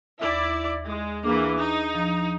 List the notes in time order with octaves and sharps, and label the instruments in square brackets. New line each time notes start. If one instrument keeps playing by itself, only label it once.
[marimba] D#2 E5 [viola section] E4 D5
[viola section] G#3
[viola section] E3 A#3 [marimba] D4 G#4
[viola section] D#4
[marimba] F3 D4